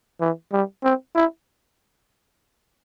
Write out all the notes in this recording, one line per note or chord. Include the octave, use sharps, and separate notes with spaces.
E3
G3
C4
E4